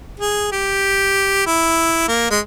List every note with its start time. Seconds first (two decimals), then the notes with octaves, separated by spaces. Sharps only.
0.20 G#4
0.52 G4
1.46 E4
2.08 A#3
2.31 G#3